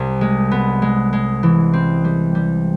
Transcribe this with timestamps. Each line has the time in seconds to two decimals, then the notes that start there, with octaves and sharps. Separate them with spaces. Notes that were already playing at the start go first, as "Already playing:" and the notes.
Already playing: C2 G3
0.21 G#3
0.51 B3
0.82 G#3
1.13 G#3
1.43 E3
1.73 C4
2.04 G3
2.35 G3